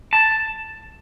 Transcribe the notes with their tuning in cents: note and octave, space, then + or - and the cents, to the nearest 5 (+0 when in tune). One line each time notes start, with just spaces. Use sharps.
A5 +5